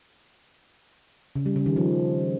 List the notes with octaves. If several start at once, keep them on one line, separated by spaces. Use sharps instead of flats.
C#3
G3
C#3
D#3
F3